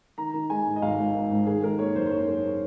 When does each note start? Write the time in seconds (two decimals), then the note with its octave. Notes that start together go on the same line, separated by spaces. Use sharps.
0.18 D#3 A#5
0.34 D#3
0.50 G#3 G#5
0.66 G#2
0.76 D#5
0.82 G#1 F5
0.99 G#2
1.15 D#3
1.31 G#2
1.46 D#3 G#4
1.62 D#3 A#4
1.79 A#3 C#5
1.95 F#1 C5
2.06 C5
2.11 A#3 C#5
2.28 A#3